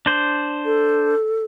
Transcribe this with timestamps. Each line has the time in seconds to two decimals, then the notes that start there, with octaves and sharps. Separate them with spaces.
0.06 D4 C5
0.65 A4